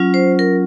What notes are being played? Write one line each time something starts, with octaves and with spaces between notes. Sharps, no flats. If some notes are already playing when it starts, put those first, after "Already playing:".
Already playing: F#3 C#4 F4
C5
A#4